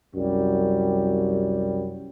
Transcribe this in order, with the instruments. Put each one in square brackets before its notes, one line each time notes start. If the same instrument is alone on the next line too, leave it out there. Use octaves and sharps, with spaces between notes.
[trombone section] C2 F#2 G3